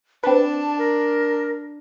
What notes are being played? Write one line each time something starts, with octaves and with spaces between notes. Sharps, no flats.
C4 D4 B4 A5
A#4